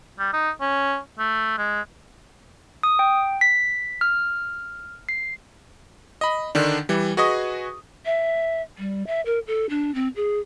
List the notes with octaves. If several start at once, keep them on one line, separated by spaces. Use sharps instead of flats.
G3
D#4
C#4
A3
G#3
D#6
G5
B6
F6
C7
D#5 B5
D3 D#3 D4
E3 G3
F#4 G#4 B4 D#5 C#6 D#6
E5
G3
E5
A#4
A4
D4
C4
G#4